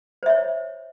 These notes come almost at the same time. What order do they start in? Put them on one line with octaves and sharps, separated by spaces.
C5 E5 C#5